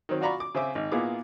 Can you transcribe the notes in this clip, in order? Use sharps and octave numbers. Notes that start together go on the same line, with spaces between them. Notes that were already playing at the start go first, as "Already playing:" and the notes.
D#3 F#3 C4
F4 F#4 D5 A#5 B5 C#6
D6
C#3 C4 E5 D6
G#1
A#2 A#3 B3 E4 G#4 D6